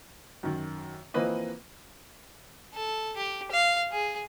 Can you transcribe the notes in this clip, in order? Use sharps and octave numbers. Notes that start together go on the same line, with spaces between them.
F#2 D#3
E3 F3 A#3 C4 B4 D#5
A4
G4
F5
G#4